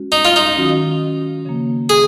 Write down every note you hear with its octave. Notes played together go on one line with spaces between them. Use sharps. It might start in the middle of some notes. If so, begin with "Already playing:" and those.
Already playing: G#3 C#4 F#4
D#4
F4
D#4
D#3 F#3 C#4 F#4
C#3 F3 A#3
G#4